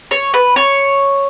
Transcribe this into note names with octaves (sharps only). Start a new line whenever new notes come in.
C#5
B4
C#5